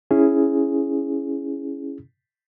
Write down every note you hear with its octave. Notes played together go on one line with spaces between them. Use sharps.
C#4 E4 G#4